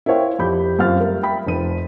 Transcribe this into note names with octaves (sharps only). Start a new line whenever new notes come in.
E4 A#4 C5 C#5 F5 G5
F2 G4 B5 G6
F#2 C4 F4 F5 F6 A6
G3 A3 A#4
E5 G5 B5 B6
F1 F3 D#7